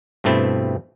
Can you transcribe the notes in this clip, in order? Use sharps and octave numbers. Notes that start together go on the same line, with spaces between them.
G2 B2 A3 C4 E4